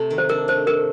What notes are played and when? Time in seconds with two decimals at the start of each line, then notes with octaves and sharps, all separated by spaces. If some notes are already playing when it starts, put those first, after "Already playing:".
Already playing: C3 A3
0.11 D#3
0.18 C5
0.29 D4 A#4
0.48 A3 C5
0.67 G2 A#4